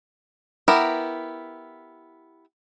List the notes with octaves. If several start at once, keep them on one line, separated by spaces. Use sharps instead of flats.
B3 E4 G4 A#4